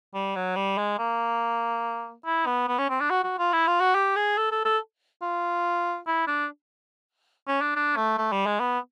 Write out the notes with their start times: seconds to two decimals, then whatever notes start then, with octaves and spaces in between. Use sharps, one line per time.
0.14 G3
0.36 F#3
0.56 G3
0.78 G#3
0.99 A#3
2.26 E4
2.46 B3
2.68 B3
2.78 C#4
2.89 C4
3.00 D4
3.10 F#4
3.24 F#4
3.39 F4
3.53 E4
3.67 F4
3.80 F#4
3.95 G4
4.16 G#4
4.37 A4
4.52 A4
4.65 A4
5.22 F4
6.07 E4
6.27 D4
7.48 C#4
7.61 D4
7.76 D4
7.96 A3
8.18 A3
8.32 G3
8.46 G#3
8.60 B3